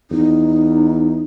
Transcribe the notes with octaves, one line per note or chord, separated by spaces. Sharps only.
E2 D#4